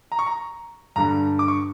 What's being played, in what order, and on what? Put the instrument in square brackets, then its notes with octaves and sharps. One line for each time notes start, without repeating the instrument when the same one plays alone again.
[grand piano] A#5
C#6
A#5
G2 D3 G3 A#5
D6
C#6